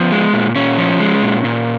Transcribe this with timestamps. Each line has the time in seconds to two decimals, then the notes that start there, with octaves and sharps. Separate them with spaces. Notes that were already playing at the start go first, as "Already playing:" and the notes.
Already playing: F3 B3
0.12 G#3
0.33 A#2
0.56 A#2 C#4
0.78 F3
1.00 G#3
1.22 A#2
1.45 A#2